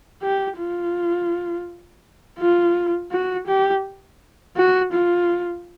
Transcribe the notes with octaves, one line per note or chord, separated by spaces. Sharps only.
G4
F4
F4
F#4
G4
F#4
F4